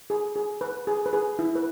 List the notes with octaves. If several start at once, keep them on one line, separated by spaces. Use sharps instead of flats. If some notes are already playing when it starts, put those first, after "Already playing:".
G#4
G#4
B4
G#4
B4
G#4
E4
B4